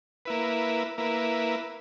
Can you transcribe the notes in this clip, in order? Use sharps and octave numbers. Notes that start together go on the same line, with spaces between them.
A#3 E4 B4
A#3 E4 B4